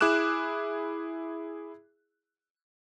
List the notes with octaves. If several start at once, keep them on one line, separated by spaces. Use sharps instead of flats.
E4 G#4 D6 F#6 E7